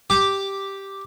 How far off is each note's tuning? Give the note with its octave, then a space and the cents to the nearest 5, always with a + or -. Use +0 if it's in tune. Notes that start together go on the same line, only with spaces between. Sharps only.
G4 +0 D6 +0